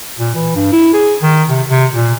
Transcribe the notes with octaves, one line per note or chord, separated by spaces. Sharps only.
A#2
E3
G2
E4
G#4
D#3
C3
C3
A#2